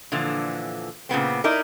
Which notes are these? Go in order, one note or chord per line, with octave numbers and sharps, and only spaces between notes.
A#2 D3 E3 F3
A#2 C#3 B3 C4
D#4 E4 A#4 D5